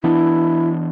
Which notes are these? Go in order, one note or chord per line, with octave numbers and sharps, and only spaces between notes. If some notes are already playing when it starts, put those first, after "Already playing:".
E3 B3 D4 E4